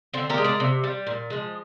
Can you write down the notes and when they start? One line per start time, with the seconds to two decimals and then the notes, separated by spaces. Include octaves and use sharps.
0.13 D3 C4
0.30 G4 A#4
0.38 G#3
0.44 A#4 D5
0.60 C3
0.84 G3
1.07 A#2
1.30 F3 G#3